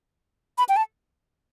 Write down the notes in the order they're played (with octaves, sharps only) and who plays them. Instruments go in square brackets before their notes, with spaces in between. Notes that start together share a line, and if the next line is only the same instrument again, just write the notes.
[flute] B5
G5
A5